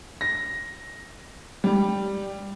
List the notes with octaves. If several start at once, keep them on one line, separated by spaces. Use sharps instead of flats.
A#6
G3